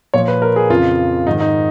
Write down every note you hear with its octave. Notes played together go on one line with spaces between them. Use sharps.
A#2 F3 C#5
B4
A#4
G#4
F2 C#3 F3 F4
G#2 D#3 D#4
D#4